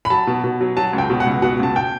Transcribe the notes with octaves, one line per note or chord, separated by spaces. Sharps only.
B5
F#3 A5
B2
B2
F#3
F#3 A5
C#2
G5
B2
F#5
C#2
B2 F#5
C#2 A5
G5